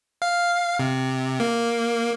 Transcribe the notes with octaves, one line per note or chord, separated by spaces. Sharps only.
F5
C3
A#3